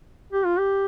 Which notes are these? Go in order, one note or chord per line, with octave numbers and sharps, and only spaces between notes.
G4
F4
G4